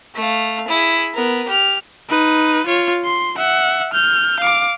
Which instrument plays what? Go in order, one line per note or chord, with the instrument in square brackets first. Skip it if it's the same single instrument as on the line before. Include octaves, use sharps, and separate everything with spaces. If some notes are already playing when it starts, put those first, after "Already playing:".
[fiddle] A3 F5
E4 G#4
B3 A#4
G4 F6
[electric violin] D#4 B4
F4 C#5
C6
E5 F#5
F6 G6
F5 D6